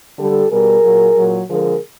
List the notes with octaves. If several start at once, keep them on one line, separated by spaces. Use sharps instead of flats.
D3 G3 G4 A4
B2 G3 G#4 A#4
A#2 F#3
A#2 F#3
D3 F3 G#3 G#4 A#4